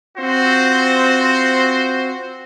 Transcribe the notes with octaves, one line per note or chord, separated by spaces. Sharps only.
C4 F4 F#4 C5